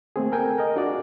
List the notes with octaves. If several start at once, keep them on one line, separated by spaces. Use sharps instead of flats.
A3 A#3 C4 G#4
A4 A#4 G5 G#5
A#4 D#5
D4 F4 F#4 G#4 D5